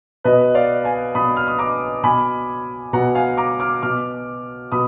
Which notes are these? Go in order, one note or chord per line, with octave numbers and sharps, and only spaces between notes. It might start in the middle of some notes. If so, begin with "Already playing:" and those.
B2 B4 D#5
D5 F5
F5 G#5
B2 B5 D#6
F6
D#6
A#5 D6
B2 G#5 B5
B2 F#5 A#5
F5 G#5
A#5 D6
D6 F6
B2 D6 F6
B2 B5 D#6